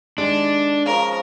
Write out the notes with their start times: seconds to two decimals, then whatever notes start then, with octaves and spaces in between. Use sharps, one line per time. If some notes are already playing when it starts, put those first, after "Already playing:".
0.18 D#3 G#3 D4 G4
0.86 C#3 F3 A#4